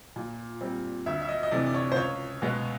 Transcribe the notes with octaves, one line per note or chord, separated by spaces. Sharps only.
A#2
G3 C4
D2 E5
E5
D#5
D#5
C3 E3 A3 D5
D5
C#5
C5
C#2 C#5
B2 G#3 B3